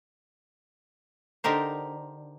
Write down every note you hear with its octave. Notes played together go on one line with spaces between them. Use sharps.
D3 D#4 G4 A#4 C5